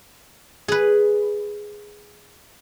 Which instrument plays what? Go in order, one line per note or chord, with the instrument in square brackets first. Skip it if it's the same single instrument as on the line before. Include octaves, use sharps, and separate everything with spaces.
[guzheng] G#4 B4